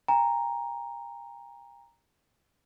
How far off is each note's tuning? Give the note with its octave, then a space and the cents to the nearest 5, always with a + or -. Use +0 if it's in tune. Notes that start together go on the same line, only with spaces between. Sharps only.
G5 +45 A#5 +0